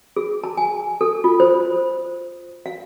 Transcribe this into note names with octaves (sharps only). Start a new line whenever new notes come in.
G#4
A5
G#5
A4
F4
C5
F5